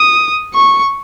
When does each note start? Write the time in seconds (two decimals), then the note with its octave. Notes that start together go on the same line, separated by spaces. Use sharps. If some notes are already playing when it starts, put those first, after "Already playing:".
Already playing: D#6
0.54 C#6